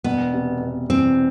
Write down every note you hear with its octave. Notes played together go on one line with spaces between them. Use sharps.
E1 B3
C3
E1
E2 C4